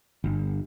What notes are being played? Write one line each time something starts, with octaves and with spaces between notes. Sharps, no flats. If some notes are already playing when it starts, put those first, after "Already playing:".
G1